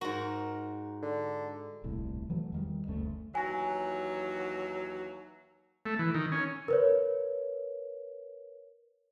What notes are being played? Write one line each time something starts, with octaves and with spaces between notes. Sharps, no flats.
G#2 F#4 A#4
D3
D#1 C2 A2
E3 F#3 A3
E2 D#3 G3
F#1 D2 A3 C#4
D#2 E3 F#3 G#5 A#6
A3
E3
D#3
C#4
A#4 B4 C#5